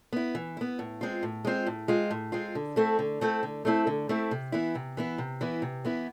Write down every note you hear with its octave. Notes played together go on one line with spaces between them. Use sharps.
B3 E4
E3
B3 E4
A2
G#3 C4 F4
A2
G#3 C4 F4
A2
G#3 C4 F4
A2
G#3 C4 F4
D3
A3 C4 E4 A4
D3
A3 C4 E4 A4
D3
A3 C4 E4 A4
D3
A3 C4 E4 A4
C3
E3 B3 E4
C3
E3 B3 E4
C3
E3 B3 E4
C3
E3 B3 E4